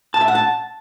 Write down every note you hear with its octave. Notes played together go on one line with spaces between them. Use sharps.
A5
E5
F#5
A5